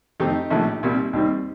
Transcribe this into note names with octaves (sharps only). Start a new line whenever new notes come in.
F2 D#3 A3 C4 D#4 G4
A#1 A2 F3 A3
C2 A#2 G3
D#2 D#3 G3 C4